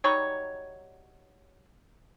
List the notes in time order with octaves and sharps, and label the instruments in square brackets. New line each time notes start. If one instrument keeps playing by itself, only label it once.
[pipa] F#3 G3 D#4 C#5